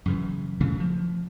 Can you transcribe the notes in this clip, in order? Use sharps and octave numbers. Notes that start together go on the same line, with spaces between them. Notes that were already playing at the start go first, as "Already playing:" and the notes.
F#2 C#3 E3
D2 C#3 E3 A3
F3